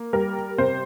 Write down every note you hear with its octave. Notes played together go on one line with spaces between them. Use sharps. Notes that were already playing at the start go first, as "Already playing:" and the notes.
Already playing: A#3
G3 A#4
C3 C5